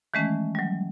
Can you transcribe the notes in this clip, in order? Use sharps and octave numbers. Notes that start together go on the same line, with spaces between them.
D#3 E3 G#3 A3 C#4
F#3 G3